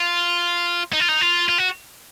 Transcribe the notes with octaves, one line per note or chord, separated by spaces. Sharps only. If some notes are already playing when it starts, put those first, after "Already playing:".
Already playing: F4
D#4
F4
D#4
F4
F4
F#4